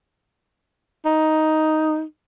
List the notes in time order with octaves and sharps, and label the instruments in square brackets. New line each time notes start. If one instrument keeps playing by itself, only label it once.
[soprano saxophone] D#4